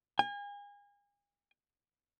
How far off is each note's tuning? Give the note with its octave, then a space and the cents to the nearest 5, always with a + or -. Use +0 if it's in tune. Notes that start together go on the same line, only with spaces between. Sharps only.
G#5 -35